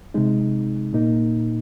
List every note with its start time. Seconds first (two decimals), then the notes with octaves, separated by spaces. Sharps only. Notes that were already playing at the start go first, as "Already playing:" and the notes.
0.14 C3 G#3 D#4
0.93 A#2 A#3 D#4